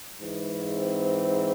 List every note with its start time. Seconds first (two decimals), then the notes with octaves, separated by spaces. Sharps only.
0.20 G#2 E3
0.73 C4